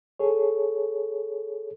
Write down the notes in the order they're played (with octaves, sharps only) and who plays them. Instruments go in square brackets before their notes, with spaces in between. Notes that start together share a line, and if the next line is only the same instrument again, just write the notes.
[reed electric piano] G#4 A4 C#5